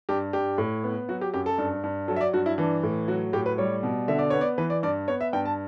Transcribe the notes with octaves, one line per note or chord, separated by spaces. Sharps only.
G2 G4
G2 G4
A2
B3
F#3 F#4
G4
F#2 G4
A4
G2
G2
F#3 A4
E5
D5
G2 F#4
E4
E3 D4
A2
F#3 F#4
A2 G4
B4
G3 C#5
B2
D3 E5
D5
B3 C#5
D5
E3 B4
D5
G2 D5
B3 C#5
E5
G2 G5
A5